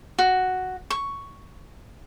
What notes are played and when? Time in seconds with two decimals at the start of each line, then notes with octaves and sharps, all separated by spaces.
0.19 F#4
0.90 C#6